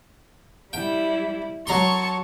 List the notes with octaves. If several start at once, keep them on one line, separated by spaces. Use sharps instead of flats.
G3 E4 G5
F#3 A5 A#5 C6 C#6